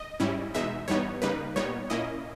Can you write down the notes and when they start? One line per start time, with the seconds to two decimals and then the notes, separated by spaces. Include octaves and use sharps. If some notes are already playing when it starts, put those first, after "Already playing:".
Already playing: D#5
0.20 G#2 G3 C#4 E4
0.54 E2 B2 G#3 D#4 E5
0.88 G2 E3 G3 B3 D#4 C#5
1.22 C#3 G3 A#3 D#4 B4
1.56 A#2 G3 B3 D#4 C#5
1.90 A#2 A#3 C#4 E4 D#5